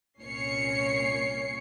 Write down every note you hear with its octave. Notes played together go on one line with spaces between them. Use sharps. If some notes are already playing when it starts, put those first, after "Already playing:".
C2 A#2 C#4 C#5 C7 C#7